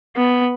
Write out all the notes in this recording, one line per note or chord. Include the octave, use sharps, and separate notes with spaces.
B3